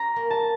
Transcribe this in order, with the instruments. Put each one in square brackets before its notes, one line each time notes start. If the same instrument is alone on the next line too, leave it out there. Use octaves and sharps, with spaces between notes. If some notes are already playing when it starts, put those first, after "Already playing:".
Already playing: [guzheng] C#4 [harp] A#5
[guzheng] A#3
[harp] A5